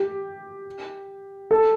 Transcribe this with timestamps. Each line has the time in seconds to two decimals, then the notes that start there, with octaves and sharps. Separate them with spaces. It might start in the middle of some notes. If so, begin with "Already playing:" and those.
Already playing: G4
1.51 A4